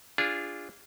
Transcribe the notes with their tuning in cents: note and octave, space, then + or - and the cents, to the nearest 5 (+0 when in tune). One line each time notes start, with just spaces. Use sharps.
D4 -10 F4 -10 G#4 -20